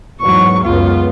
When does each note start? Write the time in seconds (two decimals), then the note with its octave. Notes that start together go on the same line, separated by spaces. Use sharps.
0.21 E2 G#2 F#3 C#6
0.64 C#2 F#2 B3 F4